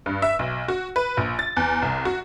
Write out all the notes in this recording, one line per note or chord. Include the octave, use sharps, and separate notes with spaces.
G2
E5
B1
F#4
B4
A#1
A6
E2
C2
F#4